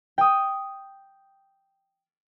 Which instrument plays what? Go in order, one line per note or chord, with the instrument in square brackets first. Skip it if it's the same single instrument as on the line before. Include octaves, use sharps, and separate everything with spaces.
[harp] G5 D#6